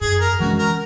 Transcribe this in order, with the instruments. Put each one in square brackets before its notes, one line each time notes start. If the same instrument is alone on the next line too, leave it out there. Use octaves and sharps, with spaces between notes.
[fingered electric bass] F#2 [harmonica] G#4
[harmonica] A#4
[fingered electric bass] E3 G#3 C#4 [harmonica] F#4
[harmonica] A#4